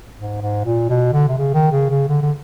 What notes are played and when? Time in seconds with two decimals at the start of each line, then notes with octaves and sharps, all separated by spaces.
0.18 G#2
0.41 G#2
0.65 A#2
0.90 B2
1.13 D3
1.29 C3
1.37 C#3
1.54 D#3
1.72 C#3
1.91 C#3
2.09 D3
2.22 D3